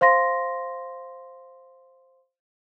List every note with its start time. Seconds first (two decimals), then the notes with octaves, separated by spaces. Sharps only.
0.01 C5 F5 C6 A#6